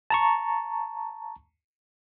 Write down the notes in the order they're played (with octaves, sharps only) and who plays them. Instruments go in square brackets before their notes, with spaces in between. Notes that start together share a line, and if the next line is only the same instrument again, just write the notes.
[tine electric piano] A5 A#5 C#6